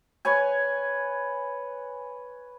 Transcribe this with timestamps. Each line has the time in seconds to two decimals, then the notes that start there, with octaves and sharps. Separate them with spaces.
0.25 B4 C#5 G#5